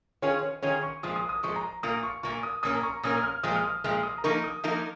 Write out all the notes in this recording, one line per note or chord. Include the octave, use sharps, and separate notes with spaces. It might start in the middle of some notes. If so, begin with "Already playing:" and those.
D#3 C#4 F4 G#4 C#5
C#5
D#3 C#4 F4 G#4 C#5
C#6
A#2 F3 G#3 D#6
D#6
D#6
A#2 F3 G#3 C#6
A#5
A#2 A#3 F4 D#6
C#6
A#2 A#3 F4 C#6
D#6
A#2 A#3 C#4 A#4 D#6
A#5
C#6
A#2 A#3 C#4 A#4 D#6
F6
A#2 F3 G#3 D#6
F6
D#6
A#2 F3 G#3 F6
D#6
A#5
F3 A#3 D#4 A#4 C#6
D#6
F3 A#3 D#4 A#4